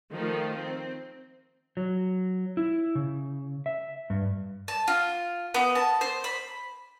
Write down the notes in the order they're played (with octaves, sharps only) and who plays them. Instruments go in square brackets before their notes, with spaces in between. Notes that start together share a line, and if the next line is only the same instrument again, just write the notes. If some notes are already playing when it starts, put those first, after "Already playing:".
[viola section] D#3 F3 A3 F4
C4
[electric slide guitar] F#3
E4
C#3
E5
G2
[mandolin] A5
F4
B3
A5
C5
B5